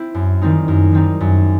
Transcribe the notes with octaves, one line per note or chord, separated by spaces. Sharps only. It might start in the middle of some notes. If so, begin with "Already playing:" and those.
Already playing: C4 E4
F#2
D#3 G3 C4 D#4
F#2
D#3 G3 C4 D#4
F#2